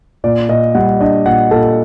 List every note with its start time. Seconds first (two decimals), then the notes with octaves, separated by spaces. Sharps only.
0.24 A#2 D5
0.49 A#2 D#5
0.75 G3 F#5
1.00 D4 D#5
1.26 A#2 F#5
1.51 A#2 A4